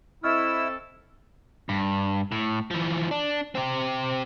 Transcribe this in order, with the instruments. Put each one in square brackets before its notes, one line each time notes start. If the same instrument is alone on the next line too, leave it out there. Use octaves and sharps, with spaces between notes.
[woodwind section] C4 A4 [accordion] E4 E6 [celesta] D#5 C#6 F6
[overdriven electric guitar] G2
A2
E3 F3
D4
C4 G4